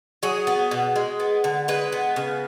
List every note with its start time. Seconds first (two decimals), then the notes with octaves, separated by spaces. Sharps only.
0.23 F#3 G#4
0.47 B3
0.71 B2
0.96 G#3
1.20 B3
1.44 D3
1.68 G#3 B4
1.93 B3
2.16 C#3